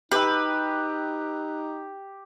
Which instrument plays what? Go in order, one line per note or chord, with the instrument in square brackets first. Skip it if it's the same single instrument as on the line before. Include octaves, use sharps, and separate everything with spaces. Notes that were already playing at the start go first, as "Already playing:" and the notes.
[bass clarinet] D#4 [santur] G4 G5 E6 [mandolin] B4